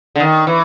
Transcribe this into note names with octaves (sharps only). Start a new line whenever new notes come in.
D3
D#3
E3